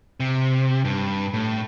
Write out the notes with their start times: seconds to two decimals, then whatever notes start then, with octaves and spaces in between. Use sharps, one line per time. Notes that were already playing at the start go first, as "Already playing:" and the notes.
0.20 C3
0.85 G2
1.34 A2